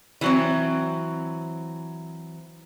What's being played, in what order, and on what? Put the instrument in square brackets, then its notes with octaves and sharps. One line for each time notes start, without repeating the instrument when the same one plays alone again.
[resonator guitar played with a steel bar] E3 F#3 C4